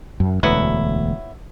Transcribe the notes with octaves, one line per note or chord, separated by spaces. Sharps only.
F#2
E1 D2 F#3 B3 D4 E4